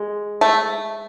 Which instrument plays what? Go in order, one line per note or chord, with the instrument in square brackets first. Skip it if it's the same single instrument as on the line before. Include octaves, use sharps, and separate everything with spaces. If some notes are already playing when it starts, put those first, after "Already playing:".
Already playing: [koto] G#3
[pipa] A3